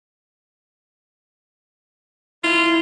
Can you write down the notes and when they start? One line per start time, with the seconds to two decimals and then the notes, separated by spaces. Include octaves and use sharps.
2.44 E4 F4